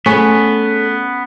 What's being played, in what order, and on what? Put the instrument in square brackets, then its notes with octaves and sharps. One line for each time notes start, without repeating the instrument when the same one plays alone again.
[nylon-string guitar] A3 G#4 C#5 [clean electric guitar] B3 [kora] C#4